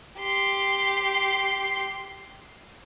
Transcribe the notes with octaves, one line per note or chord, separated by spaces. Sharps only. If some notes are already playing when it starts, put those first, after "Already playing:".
G4 C6